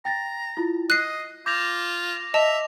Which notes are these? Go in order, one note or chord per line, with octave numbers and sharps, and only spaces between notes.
G5 A#5 A6 A#6
E4 F4
D#5 F#6 C7 D#7
F4 D6 G6 A#6 F7
D#5 E5 A5 F7